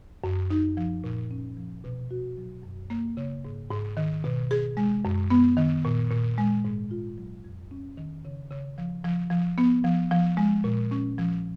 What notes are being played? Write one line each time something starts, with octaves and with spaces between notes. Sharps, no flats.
F#2
D#4
F3
A#2
C#4
F3
B2
F#4
F#3
F#2
A#3
C#3
G#2
G#2
D#3
B2
G#4
G#3
F#2
B3
D#3
A#2
A#2
G#3
G#2
F4
F#3
F2
C#4
D#3
C#3
C#3
F3
F3
F3
B3
F3
F3
G#3
A#2
C#4
F3